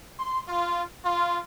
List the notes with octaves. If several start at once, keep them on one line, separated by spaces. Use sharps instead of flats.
C6
F4
F4